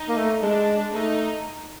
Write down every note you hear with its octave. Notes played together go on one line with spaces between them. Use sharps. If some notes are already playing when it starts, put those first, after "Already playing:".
Already playing: D#4
A#3
A3
G#3 D4
A3 D#4